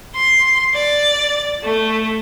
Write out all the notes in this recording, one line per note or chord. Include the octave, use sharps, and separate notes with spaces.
C6
D5
A3